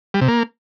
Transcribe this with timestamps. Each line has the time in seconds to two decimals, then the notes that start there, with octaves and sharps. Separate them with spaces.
0.14 G3
0.21 C3
0.28 A#3